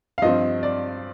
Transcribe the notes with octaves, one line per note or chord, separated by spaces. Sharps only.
F5
G2 F3 C4 D#5
D5